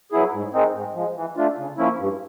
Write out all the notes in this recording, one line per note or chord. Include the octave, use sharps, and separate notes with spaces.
F#3 B3 E4 G#4
G#2
D#3 G#3 C4 D#4
G#2
F3 G#3
E3
A3 D4 F4
C#3
F3 A#3 C#4 E4
G2